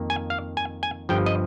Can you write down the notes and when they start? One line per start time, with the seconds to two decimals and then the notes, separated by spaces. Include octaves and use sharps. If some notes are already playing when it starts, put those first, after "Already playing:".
Already playing: F2 D#3 A#3
0.10 G#5
0.30 F5
0.57 G#5
0.83 G#5
1.09 G1 G2 F3 G5
1.26 D#5